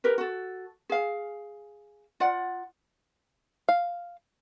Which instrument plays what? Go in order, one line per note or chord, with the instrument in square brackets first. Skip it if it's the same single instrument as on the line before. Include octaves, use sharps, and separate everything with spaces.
[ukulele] G4 A#4 B4
F#4 A4
G#4 F5
F4 D5 F#5
[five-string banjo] F5